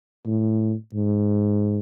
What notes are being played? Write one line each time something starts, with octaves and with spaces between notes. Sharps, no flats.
A2
G#2